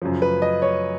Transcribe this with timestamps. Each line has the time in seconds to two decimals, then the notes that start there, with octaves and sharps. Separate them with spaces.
0.02 F#2 C#3 F3
0.22 B4
0.42 D#5
0.62 C#5